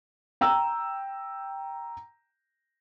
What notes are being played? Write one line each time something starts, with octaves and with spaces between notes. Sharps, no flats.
G5 A#5 E6